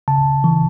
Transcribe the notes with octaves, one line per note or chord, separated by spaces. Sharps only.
C#3 A5
E3